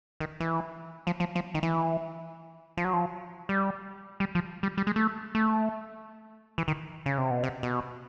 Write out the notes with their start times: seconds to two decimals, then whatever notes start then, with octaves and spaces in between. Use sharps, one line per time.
0.20 D#3
0.40 E3
1.07 F3
1.20 F3
1.35 F3
1.54 D#3
1.63 E3
2.77 F3
2.85 F#3
2.93 F3
3.49 G3
4.20 G3
4.35 F3
4.63 G3
4.77 G3
4.87 G#3
4.96 A3
5.35 A3
6.58 E3
6.68 D#3
7.06 C#3
7.18 C3
7.31 B2
7.43 C3
7.63 B2